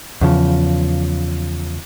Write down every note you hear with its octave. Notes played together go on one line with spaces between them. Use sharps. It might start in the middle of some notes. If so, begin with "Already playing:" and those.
E2 C#3 F3